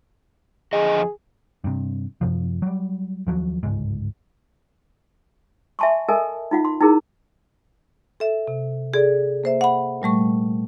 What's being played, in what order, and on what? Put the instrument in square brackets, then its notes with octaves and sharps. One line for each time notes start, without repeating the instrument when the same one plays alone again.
[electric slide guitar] F2 D3 D#5 [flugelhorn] G#4
[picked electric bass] G2 C3
F#2 C3 F3
F#3 G3
D#2 F3 F#3
G1 C#2 G#2
[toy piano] E5 G#5 A5 C6 C#6
A4 A#4 D#5 E5 G#5 A5
D#4 F4 F#5
C6
D#4 E4 G#4 A#4
[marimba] A4 E5
C3
G#4 A4 D5
A#3 C5 E5
F#5 B5
A#2 G3 A3 C#6